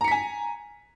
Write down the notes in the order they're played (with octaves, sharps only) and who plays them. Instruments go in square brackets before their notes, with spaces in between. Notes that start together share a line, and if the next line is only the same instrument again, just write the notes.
[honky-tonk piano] A#5
C#7
B6
G#5